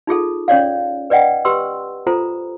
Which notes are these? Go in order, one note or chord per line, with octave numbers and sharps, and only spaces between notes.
D#4 F4 G#4 A4
C#4 C#5 D5 F5
B4 D5 D#5 F#5 G5
G4 B4 C6 E6
F4 A4 C5 A#5